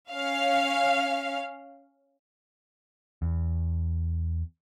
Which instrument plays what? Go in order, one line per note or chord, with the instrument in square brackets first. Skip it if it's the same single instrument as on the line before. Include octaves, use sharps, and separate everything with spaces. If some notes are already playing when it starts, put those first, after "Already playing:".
[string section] C#4 F5
[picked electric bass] E2